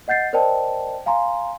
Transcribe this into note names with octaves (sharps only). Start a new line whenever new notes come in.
D#5 F#5 G6 A6 C7
A#4 C5 D5 D#5 G5 A5
F5 G#5 A#5 C6